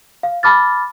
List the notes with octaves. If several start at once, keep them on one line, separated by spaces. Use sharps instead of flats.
F5
A5 B5 D6 F6 A6